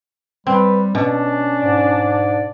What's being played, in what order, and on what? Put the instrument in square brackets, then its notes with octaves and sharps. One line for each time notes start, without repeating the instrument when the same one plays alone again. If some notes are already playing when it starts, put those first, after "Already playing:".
[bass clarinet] G3 [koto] C4 [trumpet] B4
[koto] B2 [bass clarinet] C#4 [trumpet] D4
[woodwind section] G#2 D5